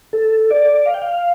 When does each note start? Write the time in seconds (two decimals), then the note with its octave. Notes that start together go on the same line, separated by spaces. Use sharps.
0.13 A4
0.51 D5
0.86 F5
0.94 G5
1.02 F5